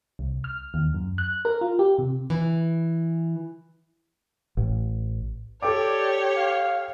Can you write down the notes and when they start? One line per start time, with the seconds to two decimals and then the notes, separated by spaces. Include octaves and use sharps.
0.19 C2
0.44 F6
0.74 D#2
0.94 F#2
1.18 F#6
1.45 A#4
1.61 F4
1.79 G4
1.99 C3
2.30 E3
4.57 A1
5.63 G4 A4 C#5 D5 G5 D6
6.36 F5